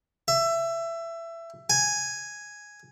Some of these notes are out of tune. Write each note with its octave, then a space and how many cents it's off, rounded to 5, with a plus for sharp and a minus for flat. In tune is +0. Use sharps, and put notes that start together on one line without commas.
E5 +20
G#5 +0